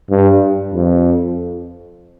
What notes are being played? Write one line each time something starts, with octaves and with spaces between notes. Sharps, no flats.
G2
F2